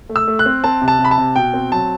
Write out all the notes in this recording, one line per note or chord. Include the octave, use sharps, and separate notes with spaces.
A3
E6
A3
F#6
C4
C4 A5
C3
A5
C3
B5
A5
C3
B2 G5
C4
F#3 A5